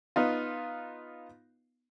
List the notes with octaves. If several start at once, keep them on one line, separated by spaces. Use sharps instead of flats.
B3 D#4 F4